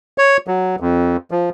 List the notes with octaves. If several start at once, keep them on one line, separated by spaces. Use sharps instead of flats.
C#5
F#3
F2
F3